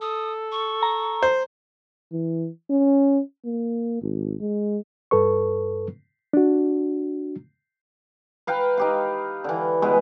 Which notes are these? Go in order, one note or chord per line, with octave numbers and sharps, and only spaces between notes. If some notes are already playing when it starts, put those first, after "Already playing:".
A4 D#6
C#6
A#5
C5
E3
C#4
A#3
G#1
G#3
G2 A4 B4 C#6
D4 F#4
B4 F5 G5 A#5
D#4 G4 F5
D3 E3
B2 G#3 G#4 B4